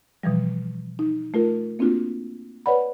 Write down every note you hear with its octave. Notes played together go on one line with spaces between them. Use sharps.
B2 E3 F3 G3
D#4
A3 F4 A#4
A#3 C4 D4 F4 F#4
B4 C#5 D5 F#5 B5